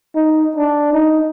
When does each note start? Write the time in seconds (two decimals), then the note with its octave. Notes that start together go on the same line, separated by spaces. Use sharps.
0.15 D#4
0.57 D4
0.93 D#4